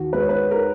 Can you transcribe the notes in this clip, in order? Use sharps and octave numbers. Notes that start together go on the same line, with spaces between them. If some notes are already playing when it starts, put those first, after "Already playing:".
Already playing: D#2 F#4
G#3 B4
C#5
B4
A#4